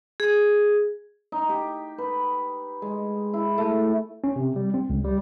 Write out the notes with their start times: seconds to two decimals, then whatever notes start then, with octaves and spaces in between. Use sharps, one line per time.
0.20 G#4
1.32 D#4
1.49 G4
1.98 B4
2.82 G#3
3.34 E4
3.58 A3
4.24 C#4
4.36 C3
4.56 G3
4.74 C4
4.90 C#2
5.05 G3